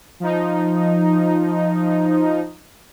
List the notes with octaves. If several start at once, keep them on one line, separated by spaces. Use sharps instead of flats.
F3 D#4